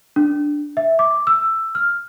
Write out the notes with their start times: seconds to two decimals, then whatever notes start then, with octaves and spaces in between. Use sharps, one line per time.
0.16 D4
0.77 E5
0.99 D6
1.27 E6
1.75 F6